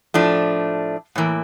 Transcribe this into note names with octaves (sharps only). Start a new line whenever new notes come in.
A2 F3 A3 D4
A2 E3 A#3